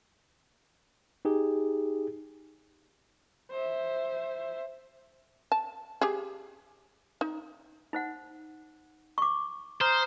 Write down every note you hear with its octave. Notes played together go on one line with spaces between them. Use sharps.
D#4 G4 G#4
C5 E5
A5
G4 G#4
D#4
D#4 C5 F#5
C#6 D6
C5 A#5 D#6 F6